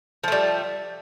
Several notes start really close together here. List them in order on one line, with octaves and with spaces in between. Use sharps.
F3 A3 G3